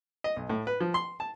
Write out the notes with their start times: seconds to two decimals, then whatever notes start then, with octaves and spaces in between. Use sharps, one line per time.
0.24 D#5
0.36 B1
0.50 A2
0.67 B4
0.80 F3
0.94 C6
1.20 A5